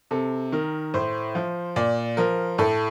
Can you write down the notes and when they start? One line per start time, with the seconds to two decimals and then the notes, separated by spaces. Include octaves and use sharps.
0.11 C3 A4
0.52 D#3 A#4
0.94 A2 C5
1.35 F3
1.76 A#2 D5
2.17 F3 A#4
2.58 A2 A4